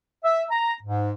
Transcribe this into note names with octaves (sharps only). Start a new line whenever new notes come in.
E5
A#5
G#2